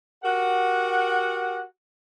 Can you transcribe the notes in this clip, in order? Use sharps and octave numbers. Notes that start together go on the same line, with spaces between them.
F#4 G4 A#4 F#5